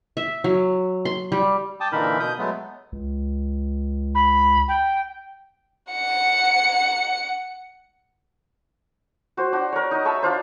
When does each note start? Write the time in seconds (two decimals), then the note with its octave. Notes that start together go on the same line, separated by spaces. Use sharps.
0.17 E5
0.44 F#3
1.05 C6
1.32 G3
1.80 G5 A5 D6 D#6
1.92 A#2 D3 E3 D#4 A#4 B5
2.20 B2 D#6 G6
2.38 F#3 G#3 A3 B3
2.92 C#2
4.15 B5
4.68 G5
5.93 F#5 C#7
9.37 F#4 C5
9.52 D4 F#4
9.72 A#4 C#5
9.91 D#4 D#5
10.05 E5 A5 B5 C#6
10.22 D4 F4 C5